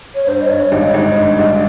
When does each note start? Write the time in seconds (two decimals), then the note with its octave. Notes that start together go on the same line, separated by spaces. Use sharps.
0.15 C#5
0.26 G2 C5
0.42 D#5
0.48 G2 C#5
0.72 G#1 D#5
0.94 G#1 D#5
1.17 G2
1.28 D#5
1.39 G#1